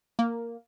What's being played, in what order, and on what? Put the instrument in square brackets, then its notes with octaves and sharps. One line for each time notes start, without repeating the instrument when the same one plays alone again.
[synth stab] A#3